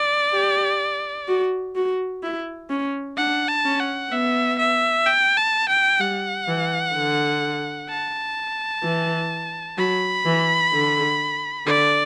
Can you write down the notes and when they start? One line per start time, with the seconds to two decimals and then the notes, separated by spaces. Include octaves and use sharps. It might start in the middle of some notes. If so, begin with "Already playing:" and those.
Already playing: D5
0.34 G4
1.28 F#4
1.76 F#4
2.23 E4
2.70 C#4
3.17 D4 F#5
3.48 A5
3.65 C#4
3.80 F#5
4.11 B3 E5
4.59 E5
5.06 G5
5.37 A5
5.69 G5
6.00 G3 F#5
6.48 E3
6.95 D3
7.89 A5
8.83 E3
9.78 F#3 B5
10.26 E3
10.73 D3
11.66 D3 D5